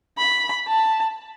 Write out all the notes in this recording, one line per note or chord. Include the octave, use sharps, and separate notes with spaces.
B5
A5